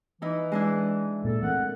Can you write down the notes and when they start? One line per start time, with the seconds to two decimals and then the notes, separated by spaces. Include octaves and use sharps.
0.22 E3 D#4 E4
0.52 G#3 D4 E4
1.24 A#2 A#3 B3 A4
1.42 E3 A3 C4 A4 A#4 F#5